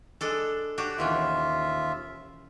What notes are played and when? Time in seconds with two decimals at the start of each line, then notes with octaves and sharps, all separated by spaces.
0.21 G#3 D4 A4
0.78 D4 F#4 G4
0.98 D#2 B2 E3 C#4 F4 E5